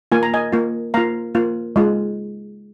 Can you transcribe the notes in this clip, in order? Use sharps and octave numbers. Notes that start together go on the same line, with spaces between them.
A#3 F4 G#5
A#5
D#5 G#5
A#3 F4
A#3 F4 F5 A#5
A#3 F4
G#3 F4